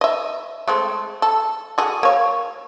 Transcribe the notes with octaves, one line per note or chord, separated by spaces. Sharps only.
D#5 E5
G#3 A3 C4
A4
F#4 G#4 A4
A#3 C#5